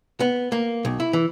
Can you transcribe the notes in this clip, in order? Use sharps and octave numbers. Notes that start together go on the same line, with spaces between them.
B3
A#3
B1
E4
E3